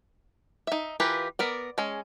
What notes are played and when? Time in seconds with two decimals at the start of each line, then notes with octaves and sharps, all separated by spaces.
0.67 D#4 E5
1.00 E3 F4 G4 A#4 B4
1.39 B3 A#4 D5
1.78 G#3 C#4